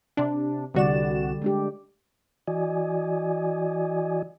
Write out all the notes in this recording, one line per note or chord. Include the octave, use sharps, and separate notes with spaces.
C3 D4
C2 D3 G3 F#4 D5 E7
G#3 D4 G4
E3 F#4 D5 D#5 G#5